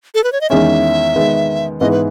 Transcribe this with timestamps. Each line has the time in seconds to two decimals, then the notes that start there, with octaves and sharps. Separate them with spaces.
0.15 A4
0.24 B4
0.32 C#5
0.41 D#5
0.50 E2 D#3 G#3 C#4 E5
1.16 D#3 G#3 B3
1.80 G#2 E3 B3 E4 G#4 D#5
1.91 B4